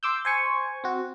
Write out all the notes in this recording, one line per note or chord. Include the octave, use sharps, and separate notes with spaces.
C6 D6 E6 G6
C5 G#5 C#6
C4 F#4